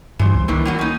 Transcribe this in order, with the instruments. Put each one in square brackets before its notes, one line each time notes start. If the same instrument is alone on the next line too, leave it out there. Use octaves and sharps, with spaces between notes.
[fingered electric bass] G2 D3 G3 [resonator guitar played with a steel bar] E3 C5
[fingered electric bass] C#2
[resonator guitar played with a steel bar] D#3 E3 D4 [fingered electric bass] A#3
[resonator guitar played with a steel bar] A2 F#3 G3
C#4 D#4